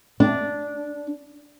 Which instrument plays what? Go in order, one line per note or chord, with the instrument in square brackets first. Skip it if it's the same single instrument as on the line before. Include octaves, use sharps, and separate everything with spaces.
[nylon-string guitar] D4